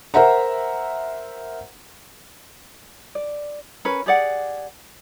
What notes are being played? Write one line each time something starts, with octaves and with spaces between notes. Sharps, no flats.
A#4 C5 E5 F#5 A#5
D5
C#4 A#4 B4
G4 G#4 D5 F#5